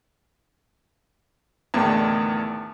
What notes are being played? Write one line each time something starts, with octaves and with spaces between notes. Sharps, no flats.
E2 A2 D3 D#3